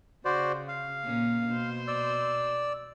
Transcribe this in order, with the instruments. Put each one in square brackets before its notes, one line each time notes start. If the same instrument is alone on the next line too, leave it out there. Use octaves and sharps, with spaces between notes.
[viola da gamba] C#3 [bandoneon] F#4 C5 D5
[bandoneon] F5
[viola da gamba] A#2 A#3 C#4
B2 C5
[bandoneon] D5 E6